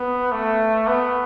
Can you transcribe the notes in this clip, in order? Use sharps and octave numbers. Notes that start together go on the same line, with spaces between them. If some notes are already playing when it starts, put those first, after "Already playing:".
Already playing: B3
A3
B3